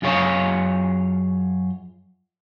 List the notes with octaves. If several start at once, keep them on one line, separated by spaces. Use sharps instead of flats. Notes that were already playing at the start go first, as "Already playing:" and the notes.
F#2 F4 G#4 C#5 F5